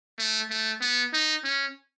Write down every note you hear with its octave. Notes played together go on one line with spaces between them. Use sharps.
A3
A3
B3
D#4
C#4